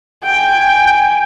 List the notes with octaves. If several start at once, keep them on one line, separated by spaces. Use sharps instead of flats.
G5 G#5